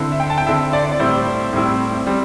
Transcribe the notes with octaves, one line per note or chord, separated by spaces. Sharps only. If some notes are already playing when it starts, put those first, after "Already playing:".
Already playing: D3 C4 E4
E5
G5
A5
G5
D3 C4 E4 E5
D5
D5
A2 G3 C4 E4 C5
A2 G3 C4 E4
G3 C4